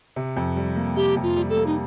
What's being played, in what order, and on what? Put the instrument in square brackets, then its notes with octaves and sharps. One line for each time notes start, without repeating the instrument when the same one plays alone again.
[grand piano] C3
F2
G3
A#3
[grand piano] C3 [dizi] G4
[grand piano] F2
[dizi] F4
[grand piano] G3
[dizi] A4
[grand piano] A#3
[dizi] D#4